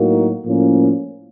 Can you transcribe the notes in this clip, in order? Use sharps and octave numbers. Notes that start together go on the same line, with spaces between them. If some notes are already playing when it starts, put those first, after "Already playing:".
Already playing: A2 F#3 A#3 D#4 F#4
A2 F3 A#3 C#4